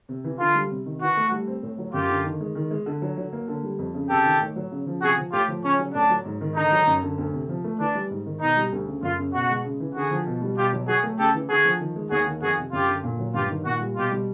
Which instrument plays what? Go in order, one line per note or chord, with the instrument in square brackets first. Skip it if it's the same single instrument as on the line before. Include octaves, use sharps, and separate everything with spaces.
[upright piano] C3
E3
[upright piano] D3 [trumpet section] F4
[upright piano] G3
C3
D#3
[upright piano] E3 [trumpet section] F#4
[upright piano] A3
G3
C4
A2
F#3
[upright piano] F#2 [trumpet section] F4 G4
[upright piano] D3
D#3
G#3
D#3
G#3
D3
F#3
F#3
A#3
D3
G3
F2
C#3
[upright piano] C3 [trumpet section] G4 A4
[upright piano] D#3
A2
F#3
C#3
F3
[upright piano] C3 [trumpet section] F#4 G#4
[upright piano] F3
[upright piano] A2 [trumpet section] F4 G4
[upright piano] F3
[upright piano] C#3 [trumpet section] C#4
[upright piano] F#3
[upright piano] A2 [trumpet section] D4
[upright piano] F#3
G#2
D#3
[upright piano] D3 [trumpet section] D#4
[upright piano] F#3
F#2
D3
D2
C3
F3
A3
[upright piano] E3 [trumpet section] D4
[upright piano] G3
G#2
D#3
[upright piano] B2 [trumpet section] D#4
[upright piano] G3
D2
C#3
[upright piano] F#2 [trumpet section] F4
[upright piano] C#3
[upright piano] B2 [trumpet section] F#4
[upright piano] G#3
C#3
E3
[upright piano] D3 [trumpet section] F#4 G#4
[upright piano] F3
B2
G3
[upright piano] B2 [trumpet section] F4 G4
[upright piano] F#3
[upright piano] F#3 [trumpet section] F#4 G#4
[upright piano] A3
[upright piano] C#3 [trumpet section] G4 A4
[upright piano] E3
[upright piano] D3 [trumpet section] F#4 G#4
[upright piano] F3
D#3
G#3
[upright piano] D#2 [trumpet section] F#4 G#4
[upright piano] D#3
[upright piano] F2 [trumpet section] F#4 G#4
[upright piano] C3
[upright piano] F#2 [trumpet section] F4 G4
[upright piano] D3
A#2
F#3
[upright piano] G2 [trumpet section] F4 G4
[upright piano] D#3
[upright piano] A#2 [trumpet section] F#4
[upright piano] G3
[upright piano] B2 [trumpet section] F4 G4
[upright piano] G3